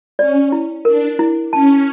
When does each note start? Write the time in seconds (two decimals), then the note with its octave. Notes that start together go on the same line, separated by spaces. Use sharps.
0.19 C#4 D5
0.52 E4
0.85 D4 A#4
1.19 E4
1.53 C#4 A5